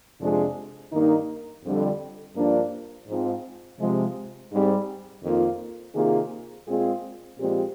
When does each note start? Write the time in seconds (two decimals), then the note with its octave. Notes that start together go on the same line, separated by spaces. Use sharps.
0.20 F2 C3 F3 G#3 D4
0.92 G2 D#3 A#3 D#4
1.64 F2 D3 G3
2.36 G2 F3 A#3 D4
3.08 G#2 F3 C4
3.80 C3 F3 G#3
4.52 G#2 G3 C4
5.24 F2 D#3 A#3 F4
5.95 C3 D#3 A#3 F4 G#4
6.67 A#2 G#3 C4 F4 G#4
7.39 A#2 F3 G#3 C4 G4